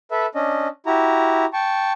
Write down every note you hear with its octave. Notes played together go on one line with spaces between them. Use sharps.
A4 B4 E5
C#4 D4 D#5
E4 F#4 G4 A#5
G5 A5 C#6